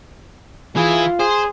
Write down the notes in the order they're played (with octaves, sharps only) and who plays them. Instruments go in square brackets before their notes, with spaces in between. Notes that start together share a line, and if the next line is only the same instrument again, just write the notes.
[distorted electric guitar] E3 E4 [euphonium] F4 [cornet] G#4
[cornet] G#4 [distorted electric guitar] C5